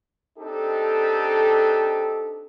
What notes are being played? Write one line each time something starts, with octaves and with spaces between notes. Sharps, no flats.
C4 D4 D#4 G4 A4